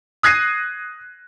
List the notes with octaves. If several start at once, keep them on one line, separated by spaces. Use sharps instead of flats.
D#6 F#6 G#6 A#6 C7 D#7